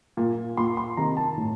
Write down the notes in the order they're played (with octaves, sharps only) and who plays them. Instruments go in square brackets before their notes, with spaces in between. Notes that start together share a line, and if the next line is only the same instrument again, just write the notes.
[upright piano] A#2
A#2 C6
C6
C3 D#3 A#5
A5
A2